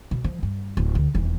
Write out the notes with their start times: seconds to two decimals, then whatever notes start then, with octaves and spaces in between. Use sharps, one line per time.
0.11 B2
0.24 F3
0.43 G2
0.77 D1
0.95 D2
1.15 D#1 E2